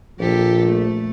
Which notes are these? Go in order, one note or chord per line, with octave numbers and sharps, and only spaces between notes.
A#1 A#2 F3 G4 A4
A3